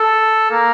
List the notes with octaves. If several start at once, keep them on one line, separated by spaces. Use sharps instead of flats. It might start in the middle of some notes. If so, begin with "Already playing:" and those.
Already playing: A4
A#3